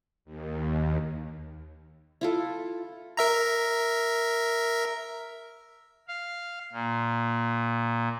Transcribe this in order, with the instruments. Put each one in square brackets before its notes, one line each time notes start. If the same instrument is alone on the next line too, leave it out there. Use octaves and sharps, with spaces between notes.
[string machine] D#2
[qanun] E4 F4 A4
[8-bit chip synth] A#4 E5 A#5
[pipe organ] F5
A#2